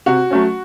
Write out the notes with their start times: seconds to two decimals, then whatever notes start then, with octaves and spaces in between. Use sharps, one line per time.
0.06 C3 F#4
0.30 F#3 A3 C#4